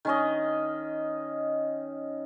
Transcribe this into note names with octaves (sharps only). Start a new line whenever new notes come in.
D#3 C#4 D#5